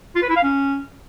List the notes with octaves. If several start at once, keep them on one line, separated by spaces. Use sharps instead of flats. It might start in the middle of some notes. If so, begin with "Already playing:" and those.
F4
B4
E4
F5
C#4